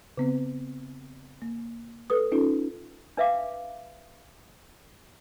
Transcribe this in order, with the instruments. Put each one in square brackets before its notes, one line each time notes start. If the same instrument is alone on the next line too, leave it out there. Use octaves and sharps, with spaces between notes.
[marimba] C#3 B3 C4
A#3
A4 B4 D#6
C#4 D#4 F4 A4
[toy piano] D4 B4 E5 F5 D6